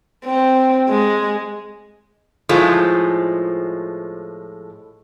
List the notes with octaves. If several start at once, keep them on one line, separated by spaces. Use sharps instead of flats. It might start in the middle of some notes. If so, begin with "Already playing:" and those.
C4
G#3
A2 F3 G#3